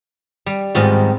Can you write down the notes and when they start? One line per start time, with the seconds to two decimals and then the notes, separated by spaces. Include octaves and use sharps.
0.46 G3
0.75 G#2 D#3 G3 B3 C4 F4